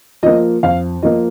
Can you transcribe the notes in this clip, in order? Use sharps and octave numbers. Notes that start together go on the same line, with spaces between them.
F3 A#3 D#5
F2 F5
F3 A#3 D#5